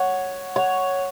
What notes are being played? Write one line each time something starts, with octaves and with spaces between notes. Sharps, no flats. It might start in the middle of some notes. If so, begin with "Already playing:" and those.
Already playing: C#5 F#5
C#5 F#5